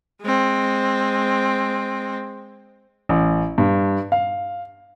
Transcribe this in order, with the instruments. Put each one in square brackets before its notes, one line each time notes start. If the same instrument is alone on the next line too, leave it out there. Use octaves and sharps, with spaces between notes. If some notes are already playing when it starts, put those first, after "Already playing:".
[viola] G#3 C4
[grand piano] A1
G2
F5